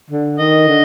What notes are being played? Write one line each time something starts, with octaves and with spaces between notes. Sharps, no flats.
D3
D#3 D#5
D3